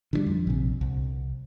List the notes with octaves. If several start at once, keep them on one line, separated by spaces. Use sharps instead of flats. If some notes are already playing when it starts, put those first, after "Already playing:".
D3 D#3 G3
F2
A#1 C3
C2